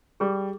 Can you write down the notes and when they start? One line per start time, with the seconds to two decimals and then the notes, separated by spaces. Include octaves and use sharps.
0.20 G3 G#4